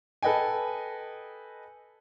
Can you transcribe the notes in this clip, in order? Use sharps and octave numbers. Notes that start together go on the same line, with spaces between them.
A4 B4 D#5 G5 G#5